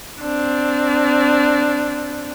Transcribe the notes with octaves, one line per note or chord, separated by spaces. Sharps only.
C4 D4